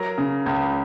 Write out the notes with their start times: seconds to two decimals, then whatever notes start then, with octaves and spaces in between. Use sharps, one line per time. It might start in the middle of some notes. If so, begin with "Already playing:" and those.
Already playing: F#3 A#4 A#5
0.18 C#3
0.46 C#2